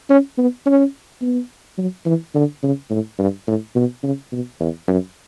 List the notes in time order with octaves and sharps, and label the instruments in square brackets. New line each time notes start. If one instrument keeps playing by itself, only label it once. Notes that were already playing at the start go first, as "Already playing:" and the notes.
[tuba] C#4
B3
C#4
B3
F#3
E3
D3
C#3
A2
G2
A2
B2
C#3
B2
E2
F#2